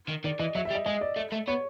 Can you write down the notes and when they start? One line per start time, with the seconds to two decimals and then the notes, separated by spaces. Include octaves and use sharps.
0.09 D#3
0.24 D#3 D5
0.39 E3 D#5
0.55 F#3 E5
0.65 E5
0.70 G3
0.75 D#5
0.86 G#3 D#5
1.01 D5
1.16 A3
1.32 A3
1.48 B3 C#5